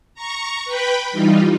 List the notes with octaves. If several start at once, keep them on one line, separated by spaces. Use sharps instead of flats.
A#5 C#6
B4 G5 B5
E3 G3 D#4 F4